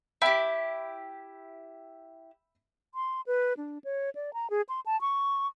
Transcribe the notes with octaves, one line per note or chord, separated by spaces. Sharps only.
E4 G4 E5 G5 B5
C6
B4
D4
C#5
D5
A#5
G#4
C6
A5
C#6